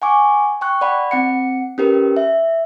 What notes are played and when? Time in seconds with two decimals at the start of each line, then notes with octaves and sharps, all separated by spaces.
0.02 F#5 G#5 C#6 D6
0.61 G5 C#6 F#6
0.81 D5 F#5 B5
1.11 C4 F#5 C#7
1.78 C#4 G4 A#4 B4
2.17 E5